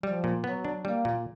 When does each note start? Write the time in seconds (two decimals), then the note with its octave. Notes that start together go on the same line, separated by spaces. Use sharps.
0.03 F3 G3
0.24 A#2
0.44 F#3 B3
0.65 D4
0.85 G3 A#3
1.05 A#2